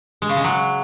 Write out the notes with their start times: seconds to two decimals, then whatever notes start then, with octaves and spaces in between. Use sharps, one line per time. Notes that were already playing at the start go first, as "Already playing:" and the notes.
0.22 G#3
0.29 C#3
0.37 G#3
0.44 F#3